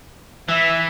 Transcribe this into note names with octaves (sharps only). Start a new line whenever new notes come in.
E3 E5